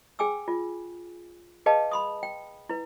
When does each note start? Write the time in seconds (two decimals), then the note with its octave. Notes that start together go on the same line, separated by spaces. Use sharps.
0.19 G#4 G5 G#5 D6 E6
0.48 F4
1.66 G#4 B4 D#5 F5 G5 A5
1.91 B5 C6 D#6
2.23 G5
2.69 E4 B4